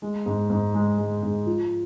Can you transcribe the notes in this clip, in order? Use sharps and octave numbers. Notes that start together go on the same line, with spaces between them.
G#3
G#2
G#2
G#3
G#3
G#2
F3